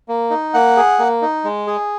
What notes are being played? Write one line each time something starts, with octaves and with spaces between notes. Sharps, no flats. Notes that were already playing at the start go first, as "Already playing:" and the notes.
A#3
D#4
A#3 F#5
G#4
A#3
D#4
G#3
G#4